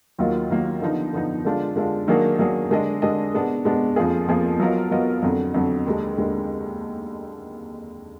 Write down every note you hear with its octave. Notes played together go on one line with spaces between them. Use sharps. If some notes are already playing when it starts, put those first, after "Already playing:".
D#2 D#3 F#3 A#3 F4
D#2 D#3 F#3 A#3 F4
D3 F3 B3 D#4
D3 F3 B3 D#4
D3 G#3 D4 F4
D3 G#3 D4 F4
D#3 F#3 A#3 D4 G#4
D#3 F#3 A#3 D4 G#4
D3 G#3 D4 G#4 D#5
D3 G#3 D4 G#4 D#5
B2 G#3 B3 D4
B2 G#3 B3 D4
F2 F3 A#3 F4 G#4
F2 F3 A#3 F4 G#4
F#3 B3 F4 A#4 D#5
F#3 B3 F4 A#4 D#5
F2 D3 F#3
F2 D3 F#3
D#2 D3 G#3
D#2 D3 G#3